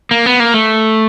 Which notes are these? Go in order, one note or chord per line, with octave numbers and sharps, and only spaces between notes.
A#3
B3
A#3
A3